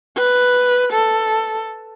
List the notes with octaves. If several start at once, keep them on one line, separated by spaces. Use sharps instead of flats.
B4
A4